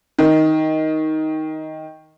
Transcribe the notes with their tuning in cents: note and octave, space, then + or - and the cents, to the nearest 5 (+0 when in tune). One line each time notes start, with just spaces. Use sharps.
D#3 +10